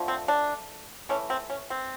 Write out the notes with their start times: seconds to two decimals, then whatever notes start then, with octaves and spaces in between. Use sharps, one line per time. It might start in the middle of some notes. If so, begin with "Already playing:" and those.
Already playing: D3 F3 A3
0.08 C4
0.28 D4
1.09 E3 A3 C#4
1.30 C4
1.50 C#4
1.70 C4